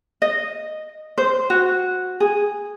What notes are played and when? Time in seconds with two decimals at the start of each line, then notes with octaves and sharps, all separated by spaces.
0.22 D#5
1.18 C5
1.50 F#4
2.20 G#4